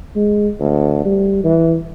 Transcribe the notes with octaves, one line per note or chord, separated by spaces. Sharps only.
G#3
D2
G3
E3